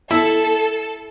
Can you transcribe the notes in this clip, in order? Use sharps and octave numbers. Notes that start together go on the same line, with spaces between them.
E4 A4